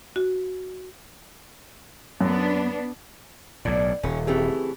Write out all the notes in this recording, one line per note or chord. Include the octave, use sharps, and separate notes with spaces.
F#4
F#2 B3 D4
B1 A2 D5
D#1 C#4
C#3 E3 A3 C4 G4 G#4